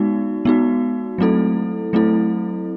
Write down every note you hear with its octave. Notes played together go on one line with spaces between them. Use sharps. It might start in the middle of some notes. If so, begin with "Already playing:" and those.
Already playing: G#3 B3 D#4 F#4
G#3 B3 D#4 F#4
F#3 A3 C4 E4 A4
F#3 A3 C4 E4 A4